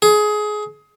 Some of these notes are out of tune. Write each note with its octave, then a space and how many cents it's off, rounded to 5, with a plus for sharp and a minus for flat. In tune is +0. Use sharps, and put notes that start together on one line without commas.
G#4 +20